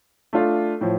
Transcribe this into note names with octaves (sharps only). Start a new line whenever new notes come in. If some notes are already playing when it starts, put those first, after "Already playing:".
A3 D4 F4
A2 F3